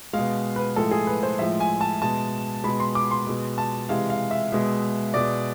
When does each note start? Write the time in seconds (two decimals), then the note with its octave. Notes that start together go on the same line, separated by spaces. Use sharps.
0.13 G#3 F5
0.19 B2
0.56 B4
0.76 A2 F3 G#3 A4
0.91 G#4
1.07 B4
1.23 C5
1.38 A2 F3 G#3 E5
1.60 G#5
1.81 A5
2.02 B2 G#3 A5
2.64 B2 G#3 B5
2.80 C6
2.95 D6
3.11 C6
3.27 B2 G#3
3.58 A5
3.89 C3 E3 G#3 F5
4.10 F5
4.31 E5
4.52 B2 G#3
5.14 B2 G#3 D5